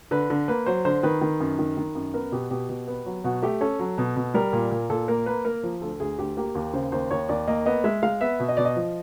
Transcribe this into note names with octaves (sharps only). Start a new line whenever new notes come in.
D3 B4
D3
A#3 B4
F#3 C5
D3 C5
D#3 B4
D#3
F#2
D#3
D#3
F#2
B3 A#4
B2 G4
B2 G4
B2
B3
F#3
B2 F#4
A3 G4
C#4 A4
F#3
B2
B2
G3 A#4
A#2
A#2
A#2 A4
A#3 A#4
A#3 B4
A#3 A#4
F3
D2 A4
D2 G#4
D2 G4
A#3 G4
D#2 G4
C#3 C5
D#2 C5
D#2 C#5
D#2 D5
A#3 D#5
B3 D#5
G#3 E5
G#3 F5
B3 E5
B2
D#5
B2 D5
D#5
F3